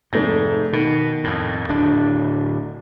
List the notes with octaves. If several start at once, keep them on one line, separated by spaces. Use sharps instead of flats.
F1 G#2 A3 A#6
B2 D#3
F2 A2
D1 D4